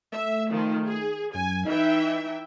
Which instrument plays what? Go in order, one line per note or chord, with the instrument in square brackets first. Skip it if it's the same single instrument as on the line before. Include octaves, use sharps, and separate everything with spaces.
[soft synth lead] A3 [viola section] E5
[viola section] D#3 F3
G#4
[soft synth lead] F#2 [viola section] G#5
[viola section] E3 E5 G5 [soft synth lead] D#4